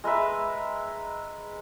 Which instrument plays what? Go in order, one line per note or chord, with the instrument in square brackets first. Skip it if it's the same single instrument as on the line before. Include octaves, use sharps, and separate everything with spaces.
[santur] G#3 A#4 B4 E5